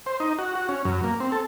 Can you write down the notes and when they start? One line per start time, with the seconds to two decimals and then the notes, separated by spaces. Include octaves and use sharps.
0.06 C5
0.20 D#4
0.39 F#4
0.55 F#4
0.69 C#4
0.85 F#2
1.04 A#3
1.20 C4
1.32 A4